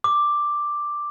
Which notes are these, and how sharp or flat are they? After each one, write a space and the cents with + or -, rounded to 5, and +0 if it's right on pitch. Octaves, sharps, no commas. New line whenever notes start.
D6 +5